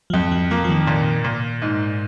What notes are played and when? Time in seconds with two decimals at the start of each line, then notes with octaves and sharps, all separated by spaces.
0.10 F3
0.14 F2 F#3
0.32 F3
0.51 F3 A#3
0.64 F3
0.69 D#3
0.87 A#2
1.24 A#2
1.62 G#2